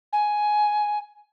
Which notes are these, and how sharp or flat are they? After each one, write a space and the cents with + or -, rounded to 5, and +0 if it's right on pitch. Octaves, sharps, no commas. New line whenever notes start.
G#5 +10